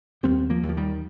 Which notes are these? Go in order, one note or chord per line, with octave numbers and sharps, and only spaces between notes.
D#2 G3 C4
F3 A#3
D#2
F3
D#3 G3